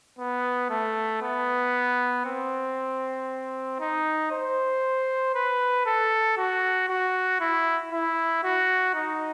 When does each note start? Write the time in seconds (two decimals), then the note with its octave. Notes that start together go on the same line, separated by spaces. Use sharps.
0.19 B3
0.70 A3
1.22 B3
2.25 C4
3.80 D#4
4.31 C5
5.34 B4
5.86 A4
6.37 F#4
6.89 F#4
7.40 E4
7.92 E4
8.44 F#4
8.95 D#4